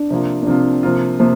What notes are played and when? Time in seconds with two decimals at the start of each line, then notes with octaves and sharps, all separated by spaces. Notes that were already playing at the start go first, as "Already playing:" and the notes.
Already playing: D4
0.10 C3 F3 A#3 F4
0.42 D4
0.47 C3 F3 A#3 C4 F4
0.83 C3 F3 A#3 F4
1.20 C3 F3 A#3